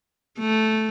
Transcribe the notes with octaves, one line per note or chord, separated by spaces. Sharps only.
A3